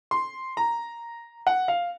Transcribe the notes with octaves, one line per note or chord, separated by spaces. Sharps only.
C6
A#5
F#5
F5